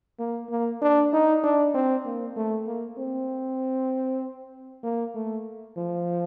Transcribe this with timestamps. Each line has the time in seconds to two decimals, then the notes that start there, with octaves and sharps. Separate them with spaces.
0.19 A#3
0.50 A#3
0.82 D4
1.13 D#4
1.43 D4
1.74 C4
2.05 A#3
2.36 A3
2.67 A#3
2.98 C4
4.83 A#3
5.15 A3
5.77 F3